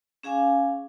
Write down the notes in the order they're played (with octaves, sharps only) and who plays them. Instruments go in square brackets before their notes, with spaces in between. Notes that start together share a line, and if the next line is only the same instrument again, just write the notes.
[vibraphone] C#4 G#4 F5 G#5 D6